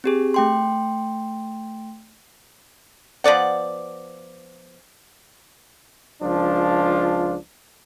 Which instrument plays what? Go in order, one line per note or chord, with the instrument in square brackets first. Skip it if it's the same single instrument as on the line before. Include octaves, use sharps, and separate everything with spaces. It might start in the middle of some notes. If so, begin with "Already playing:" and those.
[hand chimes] C4 G4 G#4
A3 G5 C6
[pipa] F3 B3 D5 F#5
[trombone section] C#2 F3 D4 F4